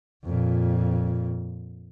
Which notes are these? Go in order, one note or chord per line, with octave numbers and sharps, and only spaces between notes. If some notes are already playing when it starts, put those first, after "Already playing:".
F2 A#2